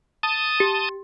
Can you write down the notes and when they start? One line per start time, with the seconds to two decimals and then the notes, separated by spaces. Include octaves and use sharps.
0.23 A5 D#6
0.60 G4